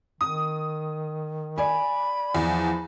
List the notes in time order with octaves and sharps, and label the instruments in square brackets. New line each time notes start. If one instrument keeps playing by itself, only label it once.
[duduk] D#3 [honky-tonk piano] D#6
[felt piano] D5 G#5 [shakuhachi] B5
[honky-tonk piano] E2 [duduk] F3